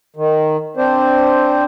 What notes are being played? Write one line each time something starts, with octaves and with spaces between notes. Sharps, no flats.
D#3
C4 D4 C5